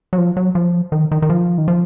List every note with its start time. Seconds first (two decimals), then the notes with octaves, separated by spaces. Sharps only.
0.13 F#3
0.18 F3
0.37 F#3
0.55 F3
0.92 D#3
1.12 D#3
1.22 D#3
1.30 F3
1.58 D#3
1.68 F3